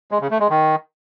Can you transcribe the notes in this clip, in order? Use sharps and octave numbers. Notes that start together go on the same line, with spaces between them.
G#3
C#3
A3
G#3
D#3